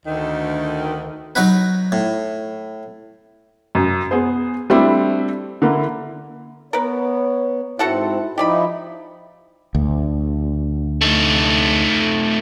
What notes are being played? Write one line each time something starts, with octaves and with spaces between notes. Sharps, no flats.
D2 D#3
F#3 D#4 F#4 B4
A2
F#2
B3 G#4 C5
G3 A3 C4 D4 E4
D3 A#3 E4
B3 A#4 B4 C#5
G#2 C4 E4 F#4 A4 F#5
F3 D#4 E4 G4 D5 D#5 B5
D2
A3 D#4